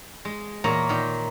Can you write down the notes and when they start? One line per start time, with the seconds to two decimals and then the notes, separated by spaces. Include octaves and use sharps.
0.25 G#3
0.64 E2 A#2 A#3 C#5 A#5
0.89 A#2 D#3